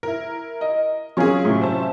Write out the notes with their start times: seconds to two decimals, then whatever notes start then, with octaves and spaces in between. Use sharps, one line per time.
0.03 E4 A#4
0.61 D#5
1.17 F#3 C#4 F4 G#4 A#4 C#6
1.45 A2 C3
1.61 C5 E5 A5